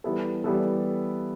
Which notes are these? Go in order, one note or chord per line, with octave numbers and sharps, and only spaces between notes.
E3 G3 B3 E4 A4
E3 G3 B3 E4 A4